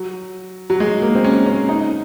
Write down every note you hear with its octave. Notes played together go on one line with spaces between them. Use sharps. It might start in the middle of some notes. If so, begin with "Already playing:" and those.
Already playing: F#3
F#3
G#3
A#3
C4
C#4
C#4
D#4